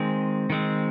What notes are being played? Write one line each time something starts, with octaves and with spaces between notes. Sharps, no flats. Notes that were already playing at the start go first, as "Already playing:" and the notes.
Already playing: D#3 G#3 C4
D#3 G#3 C4